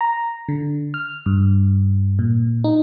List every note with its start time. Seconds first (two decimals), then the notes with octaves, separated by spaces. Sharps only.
0.01 A#5
0.49 D3
0.94 F6
1.26 G2
2.19 A#2
2.64 D#4